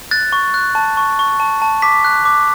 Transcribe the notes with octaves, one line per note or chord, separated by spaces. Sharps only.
F#6 A6
C#6
F#6
A5
C#6
C#6
A5
A5
D6 B6
F#6
D6